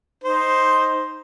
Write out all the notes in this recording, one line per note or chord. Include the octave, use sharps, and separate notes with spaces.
D#4 C5